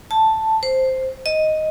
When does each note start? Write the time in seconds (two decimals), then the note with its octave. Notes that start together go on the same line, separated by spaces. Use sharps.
0.11 A5
0.63 C5
1.26 D#5